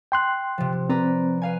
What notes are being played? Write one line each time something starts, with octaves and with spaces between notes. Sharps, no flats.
G5 C6 F#6
C3 F3
C4 B4 D5 A#5
B4 F5 G#5